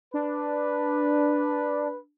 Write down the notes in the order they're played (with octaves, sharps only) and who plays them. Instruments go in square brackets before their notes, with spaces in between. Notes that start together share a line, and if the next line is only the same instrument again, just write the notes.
[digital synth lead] D4 [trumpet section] B4